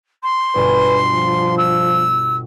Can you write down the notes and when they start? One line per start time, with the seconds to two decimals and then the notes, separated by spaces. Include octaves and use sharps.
0.23 C6
0.55 G1 B2 B4 G#5
1.14 F3
1.57 E6